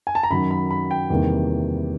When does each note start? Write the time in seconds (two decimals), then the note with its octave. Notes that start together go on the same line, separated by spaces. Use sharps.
0.07 G#5
0.15 A5
0.23 A#5
0.30 F#2 D#3 F#3 B5
0.51 B5
0.71 B5
0.91 G5
1.10 E2 C3 D#3 G3 A#3